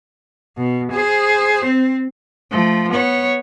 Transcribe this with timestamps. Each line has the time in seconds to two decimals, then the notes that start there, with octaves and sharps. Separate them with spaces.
0.57 B2
0.92 G#4 C5
1.64 C4
2.51 F3 A3
2.91 B3 C#5